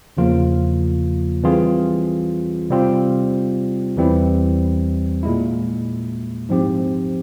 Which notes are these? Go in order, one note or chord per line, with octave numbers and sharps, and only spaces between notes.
E2 C#3 F3 A#3 F4
E3 G3 C4 F4 G#4
C3 G3 C4 F4
E2 E3 G3 C4 E4
A#2 G#3 E4
G#2 F3 C4 G4